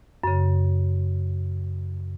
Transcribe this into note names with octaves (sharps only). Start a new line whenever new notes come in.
F#2 C#3